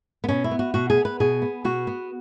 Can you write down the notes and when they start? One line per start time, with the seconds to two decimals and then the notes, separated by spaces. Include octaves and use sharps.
0.24 B3
0.28 B2 C#4
0.44 E4
0.51 B3
0.59 F#4
0.74 B2 F#4
0.90 G#4
0.97 B3
1.05 B4
1.20 B2 G#4
1.42 B3
1.65 B2 F#4
1.87 B3